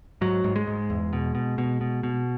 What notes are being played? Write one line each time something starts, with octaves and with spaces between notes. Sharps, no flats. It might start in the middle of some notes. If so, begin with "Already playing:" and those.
G#2 F#3
G#2
G#3
G#2
E2
B2
B2
B2
B2
B2